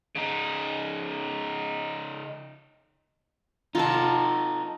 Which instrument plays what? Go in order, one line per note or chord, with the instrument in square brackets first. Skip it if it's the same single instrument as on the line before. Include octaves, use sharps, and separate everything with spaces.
[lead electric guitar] C#3 D#4
[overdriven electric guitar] D#4 A4 [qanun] F4 A5